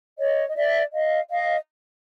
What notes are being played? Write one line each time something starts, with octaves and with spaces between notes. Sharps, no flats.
C#5 D#5
D#5
D5 E5
D#5 F5
D#5 F5